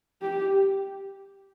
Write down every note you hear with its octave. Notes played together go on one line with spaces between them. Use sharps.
G4